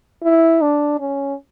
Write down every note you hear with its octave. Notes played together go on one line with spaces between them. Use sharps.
E4
D4
C#4